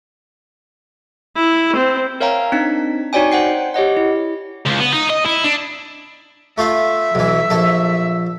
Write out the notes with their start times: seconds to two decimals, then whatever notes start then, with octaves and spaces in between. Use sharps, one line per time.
1.36 E4
1.76 C4
2.20 A#4 C#5 E5 F5 G5 A#5
2.52 C4 D4 D#4 B6
3.13 D#4 F#4 C#5 D5 G5 G#5
3.31 C5 F#5 G5 C7
3.74 G4 C#5 D#5 F#5
3.97 E4
4.66 C#2
4.80 B3
4.93 D#4
5.10 D#5
5.25 E4
5.44 D4
6.58 A3 F4 E5 F5
7.15 B1 E3
7.50 A#1 A4